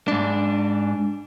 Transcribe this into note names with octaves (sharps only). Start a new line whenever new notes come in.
G#2 D4